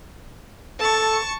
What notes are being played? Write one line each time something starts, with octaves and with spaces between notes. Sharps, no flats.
A4 A5 C#6